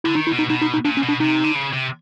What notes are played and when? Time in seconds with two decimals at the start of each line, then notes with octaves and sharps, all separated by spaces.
0.04 D3 E4
0.15 D#3 D#4
0.27 E4
0.32 B2
0.39 D#4
0.50 B2 D#4
0.61 D#4
0.74 D#4
0.85 A#2 D4
0.97 C#4
1.03 B2
1.09 D4
1.20 C3 D#4
1.44 D3
1.55 C#3
1.73 C3